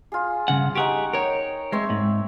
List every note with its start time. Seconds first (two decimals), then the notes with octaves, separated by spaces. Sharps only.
0.12 F4 G#4
0.48 G2 C#3 F#5
0.75 D#4 G4 G#4 F#5 C#6
1.13 D#4 A#4 C#5 G5
1.72 G#3 C4 C#5 E5
1.90 G#2